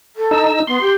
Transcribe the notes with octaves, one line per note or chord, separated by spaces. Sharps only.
A4
D#4 E6
B3 C6
G4